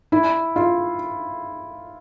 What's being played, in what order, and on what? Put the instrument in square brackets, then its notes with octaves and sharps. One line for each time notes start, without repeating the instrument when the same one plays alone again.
[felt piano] E4
F4